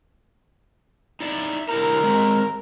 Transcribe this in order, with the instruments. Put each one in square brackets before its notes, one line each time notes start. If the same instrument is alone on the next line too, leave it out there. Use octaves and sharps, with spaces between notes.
[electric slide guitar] D#4 E4 D5
[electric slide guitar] D3 E4 A#5 [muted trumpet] A#4
[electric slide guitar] G#3 C4